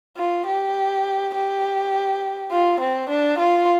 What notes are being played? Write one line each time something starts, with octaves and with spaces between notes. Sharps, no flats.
F4
G4
G4
F4
C4
D4
F4